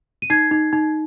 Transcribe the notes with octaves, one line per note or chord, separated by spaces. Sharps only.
D#7
D#4 G#6 C7
D#4
D#4